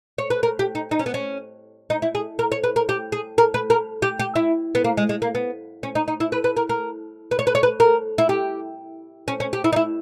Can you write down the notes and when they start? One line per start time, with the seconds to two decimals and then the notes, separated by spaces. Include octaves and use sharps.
0.18 C#5
0.30 B4
0.43 A#4
0.59 G4
0.75 D#4
0.91 D#4
0.99 C#4
1.06 B3
1.14 C#4
1.90 D#4
2.02 E4
2.15 G#4
2.39 A#4
2.52 C#5
2.64 B4
2.76 A#4
2.89 G4
3.12 G#4
3.38 A#4
3.54 B4
3.70 A#4
4.02 G4
4.19 G4
4.36 E4
4.75 B3
4.84 A#3
4.97 G#3
5.09 G#3
5.22 A#3
5.35 B3
5.83 C#4
5.95 D#4
6.08 D#4
6.20 E4
6.32 B4
6.44 B4
6.57 A#4
6.69 A#4
7.31 B4
7.39 C#5
7.47 B4
7.55 C#5
7.63 B4
7.80 A#4
8.18 E4
8.29 G4
9.28 C#4
9.40 C#4
9.53 G4
9.64 E4
9.73 D#4
9.76 E4